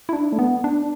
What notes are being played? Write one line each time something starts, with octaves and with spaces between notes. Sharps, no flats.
E4
D4
A3
B3
D4